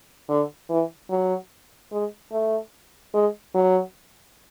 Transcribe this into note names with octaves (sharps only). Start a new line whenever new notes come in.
D3
E3
F#3
G#3
A3
G#3
F#3